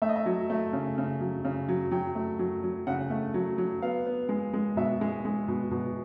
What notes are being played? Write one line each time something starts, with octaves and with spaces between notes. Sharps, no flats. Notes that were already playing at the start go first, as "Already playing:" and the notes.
A3 E5
D#5
E5
F#3
A3
C#3
C#3
F#3
C#3
F#3
F#3 G5
A3
F#3
F#3
C#3 F#5
A3
F#3
F#3
B3 F5
B3
G#3
G#3
B2 E5
G#3
G#3
B2
B2